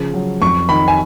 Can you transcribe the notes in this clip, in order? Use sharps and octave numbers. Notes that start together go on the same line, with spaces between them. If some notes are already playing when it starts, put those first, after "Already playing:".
Already playing: C#3 F3
F#3
F2 C#6
D#3 B5
G#5